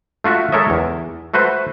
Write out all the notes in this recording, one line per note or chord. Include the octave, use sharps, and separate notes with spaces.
A3 F4 F#4 E5 F#5
G#3 A4 A#4 C#5 D#5 E5
E2
A3 F#4 B4 C5 F#5